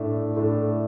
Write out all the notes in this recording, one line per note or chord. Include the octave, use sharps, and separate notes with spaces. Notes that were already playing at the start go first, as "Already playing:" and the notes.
Already playing: A2 A3 D4
A2 A3 D4